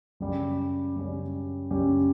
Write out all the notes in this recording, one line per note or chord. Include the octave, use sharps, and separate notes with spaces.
F#2 C#3 G3 C#4 G4
F#2 C#3 G3 C#4 G4
F#2 C#3 G3 C#4 G4